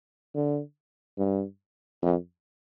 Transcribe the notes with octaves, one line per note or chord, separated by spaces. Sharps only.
D3
G2
F2